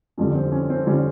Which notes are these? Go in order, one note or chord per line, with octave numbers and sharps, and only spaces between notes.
F2 D3 G3 C#4
C4
C#4
C4
D3 G3 C#4